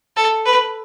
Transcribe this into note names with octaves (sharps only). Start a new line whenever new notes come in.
A4
B4